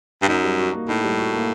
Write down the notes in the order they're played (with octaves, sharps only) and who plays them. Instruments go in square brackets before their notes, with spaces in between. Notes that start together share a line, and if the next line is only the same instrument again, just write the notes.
[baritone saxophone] G2
[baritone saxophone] F#2 [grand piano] D#4
[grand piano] G3
F#4
A#3
[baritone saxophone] A2 [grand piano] D#4
[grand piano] G3
F#4
A#3